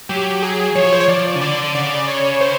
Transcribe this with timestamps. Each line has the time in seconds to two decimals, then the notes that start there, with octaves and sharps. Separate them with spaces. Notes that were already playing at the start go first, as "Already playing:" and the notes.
0.09 F#3 G4
0.42 G#4
0.75 F3 C#5
0.93 C5
1.00 C#5
1.08 F3 D5
1.35 C#3
1.41 D3 D5
1.75 C#3 D5
2.08 C#5
2.41 C5